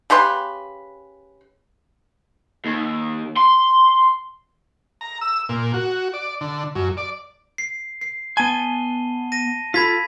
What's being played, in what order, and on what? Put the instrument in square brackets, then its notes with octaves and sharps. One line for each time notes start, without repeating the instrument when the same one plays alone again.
[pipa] C#3 G4 B4 C6
[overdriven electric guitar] D#2
C6
[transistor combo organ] A#5
E6
A#2
F#4
D5
D3
F#2
D5
[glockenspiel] C7
C7
[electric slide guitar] B3 G#5 [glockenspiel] A5 D#7 G7
[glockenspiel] A#6 D#7
[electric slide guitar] F4 A4 [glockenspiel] B5 G#6 B6